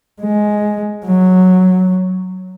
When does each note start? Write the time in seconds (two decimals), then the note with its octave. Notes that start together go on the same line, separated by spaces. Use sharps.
0.21 G#3
1.06 F#3